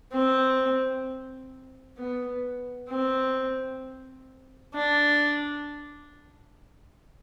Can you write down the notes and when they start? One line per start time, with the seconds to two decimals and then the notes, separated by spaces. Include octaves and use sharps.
0.12 C4
1.97 B3
2.89 C4
4.74 D4